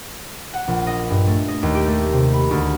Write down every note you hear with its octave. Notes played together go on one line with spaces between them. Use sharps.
F#5
A#1
D#5
G2
A3
D#5
D#2
G4
A3
C3
B5
D2